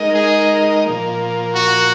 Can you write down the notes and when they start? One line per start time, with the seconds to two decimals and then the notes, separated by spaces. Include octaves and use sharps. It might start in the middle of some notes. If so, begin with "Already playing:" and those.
Already playing: G#3 D#4 A#4 D#5
0.15 G#4
0.85 A#2 F3 A#3
1.55 F#4